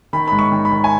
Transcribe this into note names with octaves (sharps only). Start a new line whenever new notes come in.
D#3 B5
G#2 B5
C#6
D#3
B5
D#3
G#5